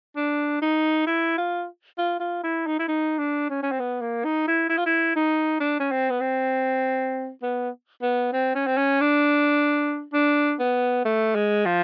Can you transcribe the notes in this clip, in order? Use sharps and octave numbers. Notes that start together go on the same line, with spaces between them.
D4
D#4
E4
F4
F4
F4
E4
D#4
E4
D#4
D4
C#4
C#4
C4
B3
A#3
D#4
E4
E4
F4
E4
D#4
D4
C#4
C4
B3
C4
B3
B3
C4
C#4
C4
C#4
D4
D4
B3
A3
G#3
F3